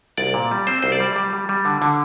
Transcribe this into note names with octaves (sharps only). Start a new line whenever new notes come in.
C2 D5
A#2
G3
C4 C5
C2 C5
D5
G3
G3
G3
G3
D3
D3